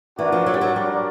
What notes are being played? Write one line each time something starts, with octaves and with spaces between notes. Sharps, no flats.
E3 D4 F#4 A#4 D5
F3
F#3
G3
F#3
G3 D4 F#4 A#4 D5